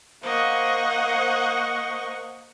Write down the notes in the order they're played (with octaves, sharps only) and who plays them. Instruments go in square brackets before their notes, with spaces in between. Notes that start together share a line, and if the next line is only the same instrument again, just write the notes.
[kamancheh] A#3 F#5 [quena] C5 [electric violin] D#5 C#6